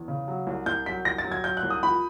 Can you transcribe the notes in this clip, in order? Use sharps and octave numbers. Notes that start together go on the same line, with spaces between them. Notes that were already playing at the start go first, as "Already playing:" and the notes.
Already playing: E2
C#3
F#3
C2
C2 G6
F#3 B6
C2 A#6
A6
F#3
G#6
F#3 G6
F#6
C2
D#6
F3 B5